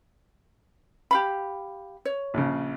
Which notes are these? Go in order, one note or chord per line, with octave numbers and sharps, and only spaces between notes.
G4 F5 B5
C#5
A#1 C#3